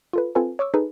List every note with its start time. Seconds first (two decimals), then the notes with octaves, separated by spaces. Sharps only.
0.13 F4 A4 B4
0.35 C4 F4 A4 B4 G#5
0.59 C#5 C#6 D6 E6
0.74 D#4 G#4 A4 B4